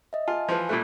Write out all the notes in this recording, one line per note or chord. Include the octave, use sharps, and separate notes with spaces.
D#5 E5
F4 F5 G#5 A5
E3 F3
A#2 G3 A3 F#6